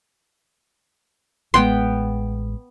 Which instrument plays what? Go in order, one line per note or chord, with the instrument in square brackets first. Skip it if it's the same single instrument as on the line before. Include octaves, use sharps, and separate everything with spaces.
[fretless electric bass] A1 G#3 [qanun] B3 G5 [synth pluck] C6